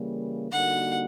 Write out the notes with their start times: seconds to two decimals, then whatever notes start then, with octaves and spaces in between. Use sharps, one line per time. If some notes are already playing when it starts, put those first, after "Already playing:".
Already playing: C#3 E3 G3 A#3
0.51 D3 G3 A#3 D#4 F#4 F#5